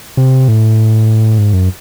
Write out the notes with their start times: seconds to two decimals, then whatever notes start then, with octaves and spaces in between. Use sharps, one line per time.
0.17 C3
0.48 A2
1.38 G#2
1.53 F#2